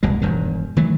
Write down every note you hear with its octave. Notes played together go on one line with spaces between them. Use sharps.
F1 C2 B2 G#3
E1 G2 D#3
D#3 E3 F#3 A3